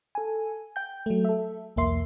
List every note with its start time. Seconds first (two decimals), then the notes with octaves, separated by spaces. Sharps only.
0.15 A4 G#5
0.76 G5 G6
1.06 F#3 A3
1.25 A4 E5
1.76 B1 E2 A#3 E5 C6